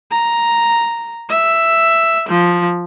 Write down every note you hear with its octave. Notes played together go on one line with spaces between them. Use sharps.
A#5
E5
F3